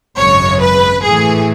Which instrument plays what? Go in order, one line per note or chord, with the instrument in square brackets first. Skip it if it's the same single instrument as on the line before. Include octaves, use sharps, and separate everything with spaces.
[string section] G#1 F#2 C#3 G#3 C#5
B4
A2 E3 A3 G#4